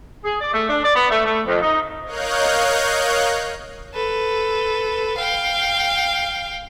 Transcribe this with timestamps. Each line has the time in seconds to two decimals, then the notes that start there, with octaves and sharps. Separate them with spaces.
0.25 G#4
0.40 D5
0.53 A3
0.70 D4
0.83 D5
0.95 B3
1.10 A3
1.25 A3
1.46 F2
1.62 D#4
2.05 A#4 C#5 D#5 F5 F#6 G6
3.94 A4 B4
5.17 F5 G5